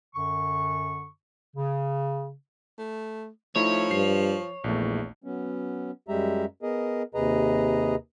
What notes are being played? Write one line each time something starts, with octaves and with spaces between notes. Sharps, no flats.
F#2 D3 C#6
C#3
A3
F3 A3 D#4 E4 C#5
G2 C7
A#1 E2 A#2 A3
F#3 B3 C#4
F#2 G3 G#3 G4 E5 A#5
B3 G#4 A#4 D#5
D#2 C3 G#4 B4 D#5 A#5